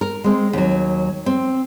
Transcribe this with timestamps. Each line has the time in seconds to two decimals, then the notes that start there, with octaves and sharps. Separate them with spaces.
0.01 A#4
0.24 G#3 C4
0.53 D#2 F#3
1.26 C4